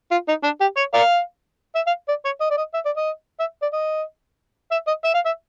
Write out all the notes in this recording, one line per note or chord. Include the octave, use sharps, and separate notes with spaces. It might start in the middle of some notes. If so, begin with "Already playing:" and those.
F4
D#4
D4
G4
C#5
A#4 D5 F5
E5
F5
D5
C#5
D#5
D5
D#5
E5
D5
D#5
E5
D5
D#5
E5
D#5
E5
F5
E5